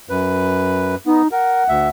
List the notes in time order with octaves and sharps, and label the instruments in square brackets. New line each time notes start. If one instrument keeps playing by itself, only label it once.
[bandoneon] F#2 B4
[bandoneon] B3 [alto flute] D#4
[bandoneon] A#4 [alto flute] F#5
[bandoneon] D2 E5